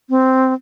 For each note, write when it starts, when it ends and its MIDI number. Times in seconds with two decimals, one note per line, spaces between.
0.10 0.53 60